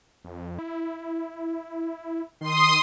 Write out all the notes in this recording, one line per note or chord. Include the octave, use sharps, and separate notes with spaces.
F2
E4
D#3 C6 D#6